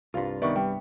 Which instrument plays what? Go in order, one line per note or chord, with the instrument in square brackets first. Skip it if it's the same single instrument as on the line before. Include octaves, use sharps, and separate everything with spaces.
[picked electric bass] C2 G2 [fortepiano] F4
[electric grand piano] D#3 D5 [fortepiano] B3 [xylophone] E5 C#6
[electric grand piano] G3 [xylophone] G5